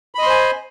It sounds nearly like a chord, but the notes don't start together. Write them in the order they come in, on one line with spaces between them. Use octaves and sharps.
B5 D#5 C6 C5 G#5